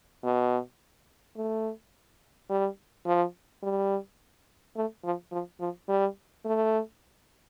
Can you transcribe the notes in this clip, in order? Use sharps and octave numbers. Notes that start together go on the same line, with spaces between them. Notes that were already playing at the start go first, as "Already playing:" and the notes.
B2
A3
G3
F3
G3
A3
F3
F3
F3
G3
A3